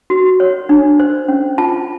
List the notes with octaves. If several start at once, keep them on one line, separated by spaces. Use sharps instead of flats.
F#4
C#5
D4
C5
C#4
F4 A5